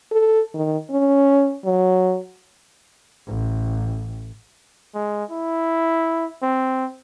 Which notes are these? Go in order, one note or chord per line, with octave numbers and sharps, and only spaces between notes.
A4
D#3
C#4
F#3
A1
G#3
E4
C4